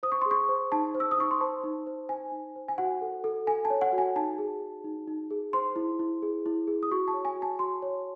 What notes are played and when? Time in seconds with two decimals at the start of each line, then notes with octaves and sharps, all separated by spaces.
0.03 C5 D#6
0.12 C#6
0.22 G#4 C6
0.31 C#6
0.49 C5
0.72 D#4 A5
0.95 C5
1.00 E6
1.11 D#6
1.18 D#4 C#6
1.31 C6
1.41 C5 A5
1.64 D#4
1.87 C5
2.09 C5 G#5
2.32 D#4
2.56 C5
2.68 G#5
2.78 F#4 F#5
3.01 A4
3.24 A4
3.47 A4 G#5
3.65 A5
3.70 C#5
3.81 F#5
3.92 F#4
3.98 G#5
4.16 D#4 A5
4.38 G#4
4.62 G#4
4.84 D#4
5.08 D#4
5.31 G#4
5.53 C5 C6
5.76 E4
5.99 E4
6.22 G#4
6.46 E4
6.67 G#4
6.83 D#6
6.91 F#4 C#6
7.08 A5
7.14 C#5
7.25 G#5
7.36 F#4
7.42 A5
7.59 F#4 C6
7.82 C#5